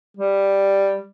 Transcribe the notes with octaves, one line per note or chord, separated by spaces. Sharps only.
G3